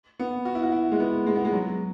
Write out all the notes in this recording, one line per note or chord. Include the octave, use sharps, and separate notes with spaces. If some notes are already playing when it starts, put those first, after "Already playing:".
B3
F#4
E4
F#4
E4
G#3
B3
G#3
B3
G#3
F#3